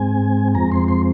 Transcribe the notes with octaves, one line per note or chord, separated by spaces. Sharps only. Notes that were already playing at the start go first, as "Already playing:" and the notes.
Already playing: G#2 G#3 C4 G#5
F2 F3 G#3 C4 A#5
C6
C6